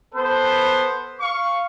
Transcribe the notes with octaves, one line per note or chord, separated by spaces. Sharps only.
B3 A4 C5
F5 C#6